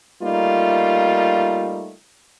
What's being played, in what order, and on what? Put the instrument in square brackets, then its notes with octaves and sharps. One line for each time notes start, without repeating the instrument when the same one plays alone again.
[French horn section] G3 A3 A#3 D#4 F4